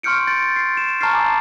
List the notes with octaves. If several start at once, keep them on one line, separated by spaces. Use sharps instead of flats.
C6 C#6 F6 G6 C#7 D7
C6 G6 A6 D7
C7
E7
A5 A#5 C#6 F6 A6 C7
G#5 A5 C#6 D6 E6